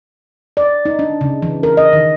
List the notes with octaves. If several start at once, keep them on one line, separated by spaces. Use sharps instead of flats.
D5
D#4
D4
C#3
E3
A#4
D#5
D#3